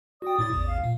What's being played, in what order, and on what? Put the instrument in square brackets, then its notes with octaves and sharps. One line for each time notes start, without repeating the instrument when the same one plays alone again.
[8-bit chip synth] F#4 G5 [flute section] D5 D#6
[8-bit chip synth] A2 E4 A6
A1 E2
[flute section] F5
[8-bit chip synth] A#2